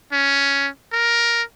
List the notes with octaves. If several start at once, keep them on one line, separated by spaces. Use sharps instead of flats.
C#4
A#4